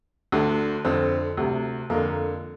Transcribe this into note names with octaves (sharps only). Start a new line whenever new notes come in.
D2 D3
F2 D3 C4
D2 C3
F2 D3 A#3